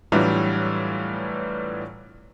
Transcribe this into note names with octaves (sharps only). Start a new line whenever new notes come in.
A2 E3 F#3 G3 D4 F4